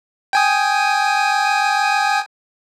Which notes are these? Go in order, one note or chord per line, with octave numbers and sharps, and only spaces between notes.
G5 G#5 D#6